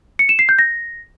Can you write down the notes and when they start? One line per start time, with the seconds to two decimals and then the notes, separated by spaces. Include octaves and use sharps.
0.19 C#7
0.29 E7
0.39 C7
0.49 G6
0.59 A#6